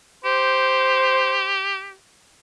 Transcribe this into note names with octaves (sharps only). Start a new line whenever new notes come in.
G4 C5